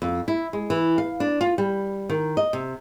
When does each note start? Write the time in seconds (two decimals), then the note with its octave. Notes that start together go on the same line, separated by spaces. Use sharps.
0.02 F2
0.28 E4
0.53 G#3
0.70 E3
0.98 F5
1.20 D4
1.41 F4
1.58 G3
2.09 D#3
2.37 D#5
2.53 C3